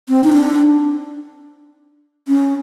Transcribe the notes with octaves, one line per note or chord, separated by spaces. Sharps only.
C4
D#4
D4
C#4